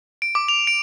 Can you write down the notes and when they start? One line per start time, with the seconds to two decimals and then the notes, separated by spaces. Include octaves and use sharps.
0.22 D7
0.35 D6
0.48 F7
0.67 D7